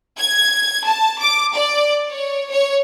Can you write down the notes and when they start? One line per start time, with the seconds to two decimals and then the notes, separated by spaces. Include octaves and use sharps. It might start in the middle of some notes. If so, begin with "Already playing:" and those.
0.18 G#6
0.85 A5
1.20 D6
1.55 D5
2.10 C#5
2.51 C#5